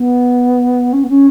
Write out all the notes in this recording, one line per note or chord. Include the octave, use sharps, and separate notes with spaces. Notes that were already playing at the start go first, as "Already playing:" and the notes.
Already playing: B3
C#4
B3
C#4